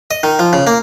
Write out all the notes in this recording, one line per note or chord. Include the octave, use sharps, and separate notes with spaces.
D#5
D#3
F3
C#3
A#3